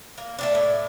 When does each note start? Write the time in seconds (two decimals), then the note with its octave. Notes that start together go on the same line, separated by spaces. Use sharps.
0.18 A#3
0.39 A3 C4 D4
0.55 A2